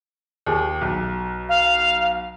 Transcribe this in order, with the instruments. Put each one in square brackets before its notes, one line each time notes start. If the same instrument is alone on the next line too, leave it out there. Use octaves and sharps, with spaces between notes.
[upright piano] D#2 G#4
B1
[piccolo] F5